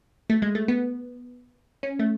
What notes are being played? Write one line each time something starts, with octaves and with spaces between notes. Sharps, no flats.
A3
G#3
A3
B3
C#4
A3